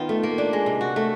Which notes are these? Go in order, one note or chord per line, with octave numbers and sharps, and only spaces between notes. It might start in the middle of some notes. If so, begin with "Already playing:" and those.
Already playing: D#3 B3 F4
A3
A#3
D4
G#3
C3
F#4
A3